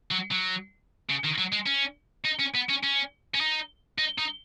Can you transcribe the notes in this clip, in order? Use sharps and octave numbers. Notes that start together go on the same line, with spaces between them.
F#3
F#3
C#3
D#3
F#3
G#3
C#4
D#4
C#4
B3
C#4
C#4
C#4
D#4
D#4
D#4